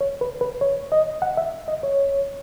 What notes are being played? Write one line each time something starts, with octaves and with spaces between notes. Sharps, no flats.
C#5
B4
B4
C#5
D#5
F#5
E5
D#5
C#5